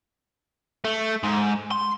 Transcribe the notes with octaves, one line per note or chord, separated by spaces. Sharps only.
A3
G#2
C6